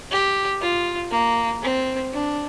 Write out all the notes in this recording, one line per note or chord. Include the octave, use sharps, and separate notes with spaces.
G4
F4
A#3
C4
D4